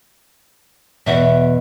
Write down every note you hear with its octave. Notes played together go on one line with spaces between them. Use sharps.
E2 B2 E5